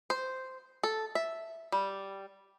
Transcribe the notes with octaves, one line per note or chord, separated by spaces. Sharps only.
C5
A4
E5
G3